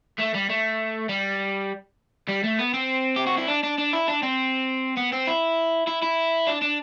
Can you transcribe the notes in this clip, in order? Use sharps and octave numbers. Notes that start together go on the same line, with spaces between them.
A3
G3
A3
G3
G3
A3
B3
C4
G4
F#4
E4
D4
D4
D4
E4
D4
C4
B3
C4
E4
E4
E4
D4
D4